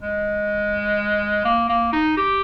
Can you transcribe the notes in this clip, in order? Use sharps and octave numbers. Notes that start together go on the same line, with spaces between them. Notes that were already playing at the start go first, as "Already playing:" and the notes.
G#3
A#3
A#3
D#4
G4